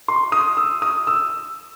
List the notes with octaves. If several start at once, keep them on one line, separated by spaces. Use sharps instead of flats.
C6
D#6
E6
D#6
E6